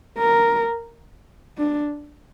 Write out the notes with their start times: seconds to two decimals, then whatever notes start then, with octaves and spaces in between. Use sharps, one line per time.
0.18 A#4
1.58 D4